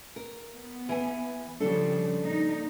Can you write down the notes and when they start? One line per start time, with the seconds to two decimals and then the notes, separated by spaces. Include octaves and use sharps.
0.16 A#4
0.54 B3
0.89 E3 G#5
1.60 C#3 F3 G3 D4 A4
2.25 A#2 D#4